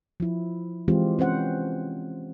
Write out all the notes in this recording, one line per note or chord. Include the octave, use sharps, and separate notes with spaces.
F3 E4
E3 G#3 C4 F4 G4
C4 C#4 C5 F#5